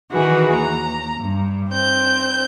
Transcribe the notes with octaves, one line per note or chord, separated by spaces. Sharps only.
D#3 E3 F#4 G#4 B4
D#2 A#5
G2
C4 G6